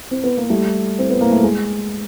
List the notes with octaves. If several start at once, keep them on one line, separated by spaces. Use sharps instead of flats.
C4
B3
A#3
G3 A3
C4
B3
A#3
A3
G#3